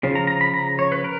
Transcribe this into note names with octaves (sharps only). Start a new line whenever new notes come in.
C#3 F3
A#5
A#5
B5
A#5
C#5
B4
A#4